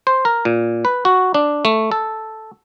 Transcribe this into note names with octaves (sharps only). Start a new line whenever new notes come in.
C5
A#4
A#2
B4
F#4
D4
A3
A4